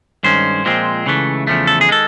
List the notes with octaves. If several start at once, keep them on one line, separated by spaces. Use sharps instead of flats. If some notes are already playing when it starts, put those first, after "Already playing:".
G2 D#3 G#3 C#4 C5
A#2 F3 G#3 C4
C#2 C#3 E3 A3
E2 C#3 F3 A3
A4
G#4
D#3 G#3 A4